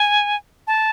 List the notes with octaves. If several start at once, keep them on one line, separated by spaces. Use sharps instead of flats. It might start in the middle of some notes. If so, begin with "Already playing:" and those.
Already playing: G#5
A5